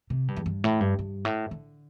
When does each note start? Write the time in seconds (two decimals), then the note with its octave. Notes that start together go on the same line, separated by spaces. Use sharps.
0.10 C3
0.28 G2
0.36 E2
0.46 G2
0.64 A2
0.81 G2
0.99 G2
1.25 A2
1.51 D3